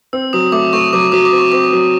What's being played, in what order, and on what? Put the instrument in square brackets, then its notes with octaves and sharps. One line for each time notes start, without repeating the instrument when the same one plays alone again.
[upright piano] C4 [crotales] E6
[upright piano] F#3 [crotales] D#6
[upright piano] A3 [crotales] D6
[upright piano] A3 [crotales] C#6
[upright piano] F#3 [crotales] D6
[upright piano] F#3 [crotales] D#6
[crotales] D6
[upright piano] C4
[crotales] C#6
[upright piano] C4 [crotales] D6
[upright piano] F#3